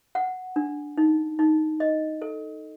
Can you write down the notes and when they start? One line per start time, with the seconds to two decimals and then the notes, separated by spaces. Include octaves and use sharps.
0.15 F#5
0.56 D4
0.97 D#4
1.39 D#4
1.80 D#5
2.22 A4